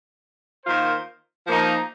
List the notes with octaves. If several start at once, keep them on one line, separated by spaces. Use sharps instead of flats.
D#3 A#3 F4 C5
F3 A#3 D#4